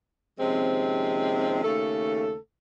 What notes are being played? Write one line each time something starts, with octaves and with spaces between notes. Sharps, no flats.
D#2 C3 F3 G#3 C4 C#4
D#2 C#3 A3 A4